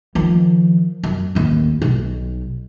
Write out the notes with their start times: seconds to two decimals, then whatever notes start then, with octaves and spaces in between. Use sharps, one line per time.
0.15 D#3 F3
1.03 F#2
1.35 A1 D#2
1.82 B1